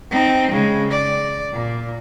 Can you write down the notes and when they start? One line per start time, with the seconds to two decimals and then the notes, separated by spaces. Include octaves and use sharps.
0.11 C4 D#4
0.51 C#3 G#3
0.91 D5
1.53 A#2